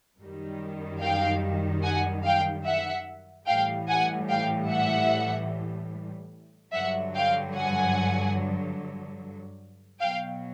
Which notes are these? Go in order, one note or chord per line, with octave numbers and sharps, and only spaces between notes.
F#2 D#3 G3
F5 G5
F#5 G#5
F5 G5
E5 F#5
A2 E3 G3 F5 G5
F#5 G#5
F5 G5
E5 F#5
G2 D3 F#3 E5 F#5
F5 G5
F#5 G#5
B2 F#3 F5 G5